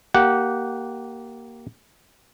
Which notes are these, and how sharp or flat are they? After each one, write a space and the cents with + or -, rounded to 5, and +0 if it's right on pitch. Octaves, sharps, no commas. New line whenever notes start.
A#3 +0 G4 -20 F#5 -5